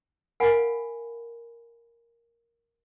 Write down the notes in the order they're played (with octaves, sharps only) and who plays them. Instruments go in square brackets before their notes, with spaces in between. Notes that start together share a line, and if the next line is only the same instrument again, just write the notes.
[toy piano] A#4 F5 F#5 G#5 B5